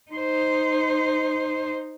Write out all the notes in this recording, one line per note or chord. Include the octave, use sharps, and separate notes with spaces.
D#4 C5